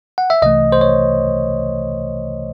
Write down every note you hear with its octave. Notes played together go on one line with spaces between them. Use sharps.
F#5
E5
C2 C3 E3 A3 D#5
C5
C#5